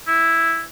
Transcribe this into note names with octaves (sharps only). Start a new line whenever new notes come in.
E4